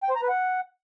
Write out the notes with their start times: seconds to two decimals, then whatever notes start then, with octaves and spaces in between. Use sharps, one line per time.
0.03 G5
0.10 C5
0.16 A#5
0.22 B4
0.29 F#5